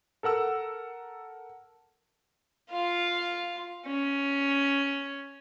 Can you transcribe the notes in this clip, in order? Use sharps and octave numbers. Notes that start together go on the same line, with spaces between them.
A4 A#4 F#5 E6
F4 F5
C#4